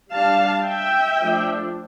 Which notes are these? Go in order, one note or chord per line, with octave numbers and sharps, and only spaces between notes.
G3 D4 F5 A5
E5 G5
F3 A3 D4